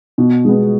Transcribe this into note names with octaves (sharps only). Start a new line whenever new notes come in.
B2
G#3 B3